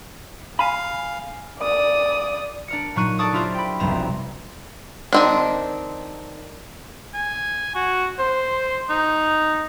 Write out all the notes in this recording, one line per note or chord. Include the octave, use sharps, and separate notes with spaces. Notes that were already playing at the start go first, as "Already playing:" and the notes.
F5 G#5 B5
D5 D#6
D4 A#4 C#7
A#2 F#3 D#4 C#6 F#6 D#7
A4 D5 A5 C#6 D#6
D4 E4 F4 G4 A#4 C5
G5 B5
F1 B1 G3 C4 A#5 E7
D#3 C4 D4
G#5
F#4
C5
D#4